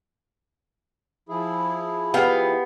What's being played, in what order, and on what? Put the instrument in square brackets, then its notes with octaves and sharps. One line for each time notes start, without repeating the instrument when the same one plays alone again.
[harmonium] F3 E4 G#4
[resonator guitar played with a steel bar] B3 G4 F5